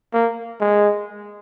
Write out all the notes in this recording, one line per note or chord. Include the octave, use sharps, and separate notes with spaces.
A#3
G#3